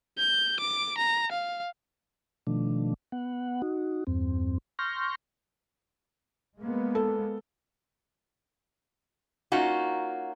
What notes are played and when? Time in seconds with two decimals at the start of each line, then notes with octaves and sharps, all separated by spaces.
0.18 G6
0.60 D6
0.98 A#5
1.32 F5
2.47 B2 D#3 F3 A3 D4
3.12 B3 F#5
3.62 D#4 F#4
4.07 E2 G2 C4
4.79 C6 C#6 F6 G6 A#6
6.59 G#3 A#3 B3
6.95 A4
9.52 A#3 C#4 D#4 F4 F#4